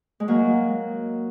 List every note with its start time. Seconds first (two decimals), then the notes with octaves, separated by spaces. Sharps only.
0.20 G#3
0.28 F#3 A#3